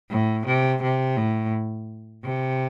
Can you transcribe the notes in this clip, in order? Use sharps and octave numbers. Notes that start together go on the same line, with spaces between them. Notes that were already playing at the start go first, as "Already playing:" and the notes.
A2
C3
C3
A2
C3